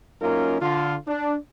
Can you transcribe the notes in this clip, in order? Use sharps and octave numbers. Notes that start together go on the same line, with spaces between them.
F#2 A#3 C#4 D#4 F4 A#4
D3 F4
D4